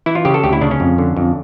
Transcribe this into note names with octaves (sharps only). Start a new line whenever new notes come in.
E3 E4
F4
C#3 G4
A4
D2 G4
E4
C#3 D4
C#4
F2
D3
F2